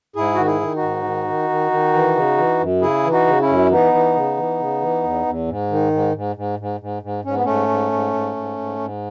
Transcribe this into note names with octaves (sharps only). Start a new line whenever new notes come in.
G#2 E4 G#4
D#3 F#4
E4 G#4
D#3
D#4 F#4
G#2
D#3
D#3
D#3
D#3
E3
C#3
E3
F#2
C#3 E4 G#4
E3
D#4 F#4
C#3
C#4 E4
F#2
E3 B3 D#4
E3
C#3
E3
C#3
E3
E2
E2
G#2
D#3
G#2
G#2
G#2
G#2
G#2
G#2
G#2 C#4
B3
G#2 A3 C#4
G#2
G#2
G#2
G#2
G#2
G#2